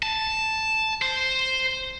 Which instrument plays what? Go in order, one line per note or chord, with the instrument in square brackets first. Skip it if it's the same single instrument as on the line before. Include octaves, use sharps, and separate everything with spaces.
[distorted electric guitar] A5
C5